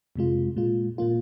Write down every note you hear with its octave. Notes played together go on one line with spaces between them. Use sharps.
F2 C3 G#3 F4
A#2 G#3 F4
A#2 A#3 F4